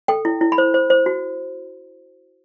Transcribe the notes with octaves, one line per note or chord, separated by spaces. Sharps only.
A4 G5
E4
E4
B5
C5
C5
C5
F#4